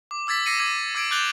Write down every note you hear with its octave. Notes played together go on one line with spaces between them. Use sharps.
D6
D6 E6 G#6 A6 B6
D6 E6 A#6 C7 C#7 D#7
D6 G#6 D#7
D6 E6 G#6 D7
D6 F#6 G6 A6 F7 G7